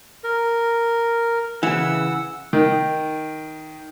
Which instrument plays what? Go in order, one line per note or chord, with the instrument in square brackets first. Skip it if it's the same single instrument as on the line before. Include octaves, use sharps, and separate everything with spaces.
[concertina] A#4
[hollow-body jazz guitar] C#3 E3 [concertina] F#5 E6
[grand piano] D#3